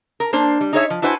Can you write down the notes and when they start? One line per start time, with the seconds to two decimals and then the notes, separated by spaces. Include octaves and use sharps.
0.20 A#4
0.33 A#3 D4 C5
0.61 G3
0.73 D#4 G#4 C#5 E5
0.90 F3
1.02 D4 E4 F#4 B4 C5 G#5